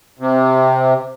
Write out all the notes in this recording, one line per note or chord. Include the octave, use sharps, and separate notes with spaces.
C3